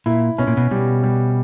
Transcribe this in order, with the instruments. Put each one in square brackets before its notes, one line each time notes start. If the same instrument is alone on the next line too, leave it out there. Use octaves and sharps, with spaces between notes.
[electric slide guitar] A#2 [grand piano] E4
[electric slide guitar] B2 [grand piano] C#4
[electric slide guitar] A#2
B2
[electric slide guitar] B2 [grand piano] G3
[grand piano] G3